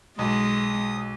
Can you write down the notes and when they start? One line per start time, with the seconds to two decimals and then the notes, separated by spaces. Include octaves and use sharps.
0.19 B1 G#3 D#6